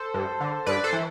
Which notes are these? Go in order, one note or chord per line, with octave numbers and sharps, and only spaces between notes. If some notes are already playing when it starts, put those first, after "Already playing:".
Already playing: A4 C5
G2
D3
G2 B4 D5
A4 C5
E3